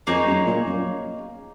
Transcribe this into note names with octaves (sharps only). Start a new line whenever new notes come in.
F2 A#3 D#4 G#4 C#5
F#2
A#2
F#2